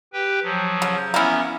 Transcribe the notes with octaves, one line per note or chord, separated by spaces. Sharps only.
G4 B4 G5
F3 F#3
C#3
E3 A#3 B3 C#4